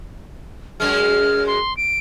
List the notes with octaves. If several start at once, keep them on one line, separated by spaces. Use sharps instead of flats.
F#2 G#3 F6
C6
D7